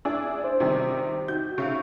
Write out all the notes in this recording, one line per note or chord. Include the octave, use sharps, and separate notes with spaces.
D4 E4 G#4 E6
C5
C3 D#3 G3
D#4 F#4 G6
C#3 E5 F5 C#6